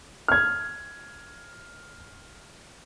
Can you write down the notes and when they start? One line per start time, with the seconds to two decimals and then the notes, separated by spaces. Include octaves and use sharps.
0.28 F6 G#6